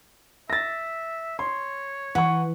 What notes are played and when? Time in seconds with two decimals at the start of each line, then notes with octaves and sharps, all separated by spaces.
0.50 E5 A6 A#6
1.39 C#5 C6
2.15 E3 F#5 C#6